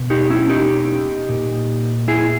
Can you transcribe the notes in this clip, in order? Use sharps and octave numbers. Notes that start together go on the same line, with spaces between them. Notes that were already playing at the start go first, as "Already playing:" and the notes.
Already playing: B2
D#4 G4
C#4 E4
D#4 G4
A#2
E4 G#4